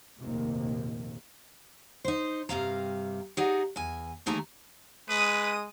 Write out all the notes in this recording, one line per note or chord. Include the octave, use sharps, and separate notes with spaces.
F1 A#1 D#2 C3 D#3 A#3
D#4 C5
G2 C3 F5 A#5
D#4 G4 G#4 D5 D#5 F#5
E2 G#5
D#2 E3 A3 D#4 G#4 A#5
G#3 B4 D#6